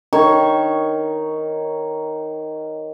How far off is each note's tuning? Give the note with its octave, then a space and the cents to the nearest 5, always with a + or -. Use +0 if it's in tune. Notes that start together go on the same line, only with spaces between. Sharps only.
D#3 +0 C#5 +0 C#6 +0